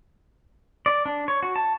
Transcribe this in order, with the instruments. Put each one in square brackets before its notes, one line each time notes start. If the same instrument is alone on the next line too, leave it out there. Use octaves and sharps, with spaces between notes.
[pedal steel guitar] D5
D4
C#5
F#4
A5